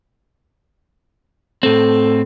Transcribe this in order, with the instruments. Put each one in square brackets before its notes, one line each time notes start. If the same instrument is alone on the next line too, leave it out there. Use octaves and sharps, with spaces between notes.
[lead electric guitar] A2 C4 [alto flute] A4